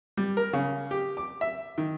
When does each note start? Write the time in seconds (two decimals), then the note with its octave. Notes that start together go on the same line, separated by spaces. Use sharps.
0.17 G3
0.37 A#4
0.53 C#3
0.91 G4
1.17 D6
1.41 E5
1.78 D#3